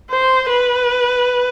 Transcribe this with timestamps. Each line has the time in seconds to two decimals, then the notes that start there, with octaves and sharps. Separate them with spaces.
0.10 C5
0.49 B4